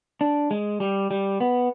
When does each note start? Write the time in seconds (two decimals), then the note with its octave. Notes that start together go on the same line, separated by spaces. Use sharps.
0.21 D4
0.51 G#3
0.80 G3
1.11 G3
1.40 B3